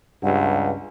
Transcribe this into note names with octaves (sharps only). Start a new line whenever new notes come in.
C#2 G2 F#5